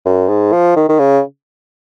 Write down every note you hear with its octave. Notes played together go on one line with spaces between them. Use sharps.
F#2
G#2
F3
D#3
D#3
C#3